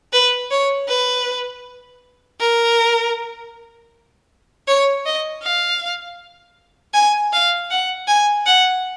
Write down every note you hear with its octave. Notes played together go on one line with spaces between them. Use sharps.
B4
C#5
B4
A#4
C#5
D#5
F5
G#5
F5
F#5
G#5
F#5